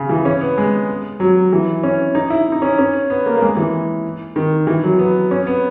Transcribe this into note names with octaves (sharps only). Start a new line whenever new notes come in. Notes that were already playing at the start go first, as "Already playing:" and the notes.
Already playing: C#3
E3
C#4
B3
G#3
F#3
E3
C#4
D#4
E4
D#4
C#4
C#4
B3
A#3
A#3
G#3
E3
D#3
E3
F#3
B3
C#4
B3